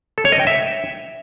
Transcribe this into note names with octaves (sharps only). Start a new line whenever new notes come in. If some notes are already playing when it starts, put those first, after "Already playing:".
A4
C#5
D#5
G5
E5